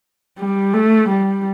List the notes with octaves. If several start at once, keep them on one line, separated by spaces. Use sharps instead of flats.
G3
A3
G3